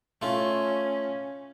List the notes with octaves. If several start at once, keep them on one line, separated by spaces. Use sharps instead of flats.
A3 C#4 F4